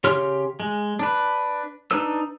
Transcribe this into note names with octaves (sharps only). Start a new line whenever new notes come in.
C#3 G4 C#5 C6 F6
G#3
D4 B4
D4 D#4 B4 E6